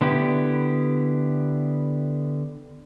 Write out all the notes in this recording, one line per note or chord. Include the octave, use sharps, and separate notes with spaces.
D3 B3 E4 G4